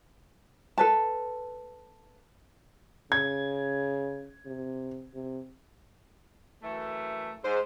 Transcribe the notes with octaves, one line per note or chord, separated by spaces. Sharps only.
A4 B4 A5
C#3 G#6
C3
C3
F#2 E3 A3
G#2 C5